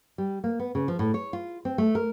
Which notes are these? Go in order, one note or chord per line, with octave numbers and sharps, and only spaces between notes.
G3
A#3
B3
C#3
F3
A2
C#5
F4
C4
A3
A#4